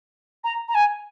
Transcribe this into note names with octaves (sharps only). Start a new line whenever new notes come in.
A#5
A#5
G#5